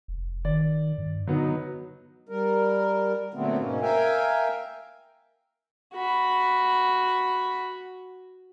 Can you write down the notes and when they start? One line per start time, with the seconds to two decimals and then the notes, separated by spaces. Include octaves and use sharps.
0.08 F1
0.45 D#3 D5
0.98 G2
1.27 D3 F#3 B3 D#4
2.29 G3 A#4
3.34 A#2 D3 F#3 A3 B3 C4
3.59 G#2 B2 A#3 C#4
3.82 A#4 E5 F5 G5 G#5
5.94 F#4 B5